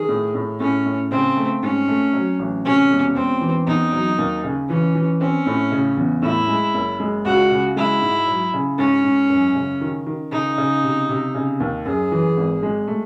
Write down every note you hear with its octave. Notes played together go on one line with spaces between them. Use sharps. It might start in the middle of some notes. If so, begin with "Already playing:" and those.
Already playing: D#3 G#4
A2
A2
A2 C#4
A2
C#3 C4
A3
G#2 C#4
A3
F#3
A1
C3 C#4
E1
E1 C4
E3
E2 D#4
F#3
D#2
C#3
E3 C#4
E3
C4 C#4
A2
C#3
E2
A2 E4
G#3
F#1
G#3
C#2 F#4
C#3
G#3 E4
G#2
F#3
C#3
G#2 C#4
G#2
F#2
C#3
D#3
D#3
C#3 D#4
C#3
C3
C3
C#3
D#2
F#2 G#4
E3
G#1
G#3
A3